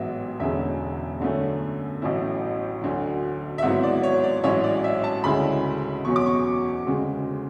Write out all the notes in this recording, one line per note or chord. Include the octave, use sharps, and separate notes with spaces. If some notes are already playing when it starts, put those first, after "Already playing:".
Already playing: A1 G#2 F#3 B3 E5
E1 E2 D3 G#3 C#4 E5
F#2 D3 A3 C#4
A1 A2 F#3 C#4 E4
D2 D3 F#3
E5
G#1 G#2 F#3 B3 E4 F#5
D5
C#5
D5
A1 G#2 F#3 C#4 E4 C#5
D5
E5
A5
D2 C#3 G#3 C#4 E4 B5
E2 B2 F#3 C#4 C#6
D6
C#6
D2 C#3 G#3